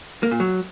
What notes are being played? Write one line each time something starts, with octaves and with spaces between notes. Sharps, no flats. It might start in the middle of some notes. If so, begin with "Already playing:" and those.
A#3
A#2
F#3